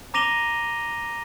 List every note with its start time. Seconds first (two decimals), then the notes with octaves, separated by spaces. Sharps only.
0.14 A#5 D6 A#6 D#7 F7 G7